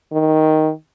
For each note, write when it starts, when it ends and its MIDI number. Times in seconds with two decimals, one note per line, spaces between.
0.12 0.71 51